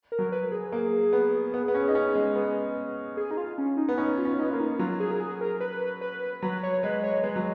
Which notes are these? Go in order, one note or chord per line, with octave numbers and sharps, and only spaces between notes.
A#4
F#3
B4
G#4
A#3 G#4
B3
B3
B3
C#4
D#4
C#4
G#3
B3
G#4
D#4
F4
C#4
D#4
B3
C#4 D#4
F4
C#4
B3 D#4
A#3 F4
D#4
F#3 F4
G#4
A#4
G#4
A#4
B4
B4
F#3 B4
C#5
G#3 B4
C#5
G#3 B4
F#3